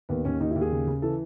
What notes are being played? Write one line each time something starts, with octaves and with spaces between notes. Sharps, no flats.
D#2 B3
D#2 C#4
D#2 D#4
E4
D#2
G#4
C#3
C#3
E3 A4